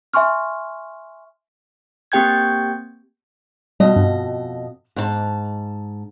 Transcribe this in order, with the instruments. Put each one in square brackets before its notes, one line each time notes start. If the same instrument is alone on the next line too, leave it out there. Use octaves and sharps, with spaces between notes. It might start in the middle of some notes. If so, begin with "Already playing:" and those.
[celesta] E5 G#5 C6 C#6 F6
[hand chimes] A#3 C4 G4 G5 G6 G#6
[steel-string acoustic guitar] F2 B2 D#5 [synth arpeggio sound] G3
[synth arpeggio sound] G2
[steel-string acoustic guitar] G#2 C5 A5